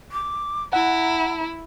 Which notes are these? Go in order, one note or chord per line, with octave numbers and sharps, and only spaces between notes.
D6
E4 F#5 A#5